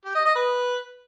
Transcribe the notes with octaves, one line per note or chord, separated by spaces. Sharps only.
G4
D#5
D#5
B4